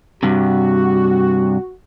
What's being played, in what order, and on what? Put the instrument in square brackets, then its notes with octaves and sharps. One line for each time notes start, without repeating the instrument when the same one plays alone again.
[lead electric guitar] G2 C3 [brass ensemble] F#4